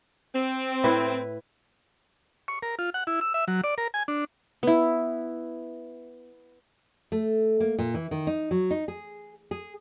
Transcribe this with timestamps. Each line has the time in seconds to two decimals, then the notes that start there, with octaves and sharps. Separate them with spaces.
0.33 C4
0.84 A2 E4 B4
2.48 C#6
2.62 A#4
2.79 F4
2.94 F#5
3.07 E4
3.21 E6
3.34 E5
3.48 F#3
3.64 D5
3.78 A#4
3.94 G#5
4.08 D4
4.63 B3 E4
7.12 A3
7.60 A#3
7.79 A#2
7.94 E3
8.11 D#3
8.27 D#4
8.51 F#3
8.71 D#4
8.88 G#4
9.51 G#4